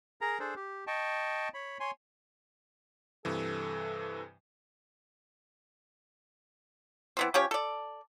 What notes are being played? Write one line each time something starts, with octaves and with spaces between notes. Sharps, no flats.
G#4 A#4 A#5
D4 G#4 A4 C5
G4
D#5 G5 A5 C#6
C#5 B5
C#5 G#5 C6
G2 C3 E3 A4
E3 B3 C4
F3 C#4 G4 C#5
A4 D5